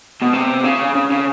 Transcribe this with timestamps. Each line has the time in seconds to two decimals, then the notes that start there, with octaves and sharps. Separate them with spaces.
0.22 B2
0.34 C3
0.64 C#3
0.95 C#3
1.11 C#3